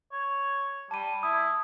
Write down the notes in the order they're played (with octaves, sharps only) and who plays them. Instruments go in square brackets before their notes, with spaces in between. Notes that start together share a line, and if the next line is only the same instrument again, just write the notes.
[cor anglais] C#5
[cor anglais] G3 [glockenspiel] A5 D#7
[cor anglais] E4 [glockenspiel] D#6